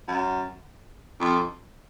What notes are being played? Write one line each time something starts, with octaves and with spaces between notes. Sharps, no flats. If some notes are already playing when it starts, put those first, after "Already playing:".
F#2
F2